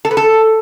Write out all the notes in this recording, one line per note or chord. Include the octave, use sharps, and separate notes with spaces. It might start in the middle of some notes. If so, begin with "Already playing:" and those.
A4
B4
A4